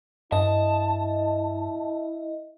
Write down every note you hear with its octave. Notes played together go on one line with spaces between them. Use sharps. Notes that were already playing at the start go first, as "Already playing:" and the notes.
G2 E4 D#5 A5